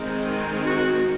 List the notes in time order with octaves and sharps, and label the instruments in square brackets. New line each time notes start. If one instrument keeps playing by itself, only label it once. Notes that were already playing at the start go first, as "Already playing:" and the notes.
Already playing: [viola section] D#3 G#3 C4
F#4